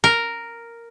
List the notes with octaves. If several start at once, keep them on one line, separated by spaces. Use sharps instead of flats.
A#4